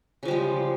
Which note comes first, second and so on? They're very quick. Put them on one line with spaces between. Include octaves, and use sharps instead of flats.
C#3 F3 G3 G#3